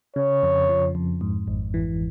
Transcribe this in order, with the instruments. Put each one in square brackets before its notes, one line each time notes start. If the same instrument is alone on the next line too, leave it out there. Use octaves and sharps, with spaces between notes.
[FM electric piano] C#3 [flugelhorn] C#5
[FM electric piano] F2
F3
F2
G#2
G#1
E3